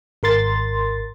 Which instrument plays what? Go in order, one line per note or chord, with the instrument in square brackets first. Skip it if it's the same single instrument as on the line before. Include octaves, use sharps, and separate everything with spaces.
[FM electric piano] G#1 A#4 C6 A6